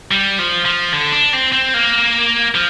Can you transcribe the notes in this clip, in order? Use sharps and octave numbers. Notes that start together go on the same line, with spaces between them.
G3
F3
F3
D3
D4
C4
C4
A#3
F3